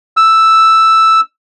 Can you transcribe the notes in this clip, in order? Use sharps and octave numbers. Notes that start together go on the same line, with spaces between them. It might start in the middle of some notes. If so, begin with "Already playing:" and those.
E6